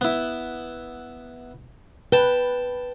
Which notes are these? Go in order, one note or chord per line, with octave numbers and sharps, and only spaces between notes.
B3 E4
B4 G5 A5